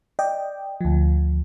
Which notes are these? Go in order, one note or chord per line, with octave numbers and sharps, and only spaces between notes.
D5 D#5 G5
D2 F3